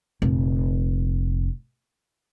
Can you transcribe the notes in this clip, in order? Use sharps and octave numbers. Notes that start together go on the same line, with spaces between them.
F1 A#2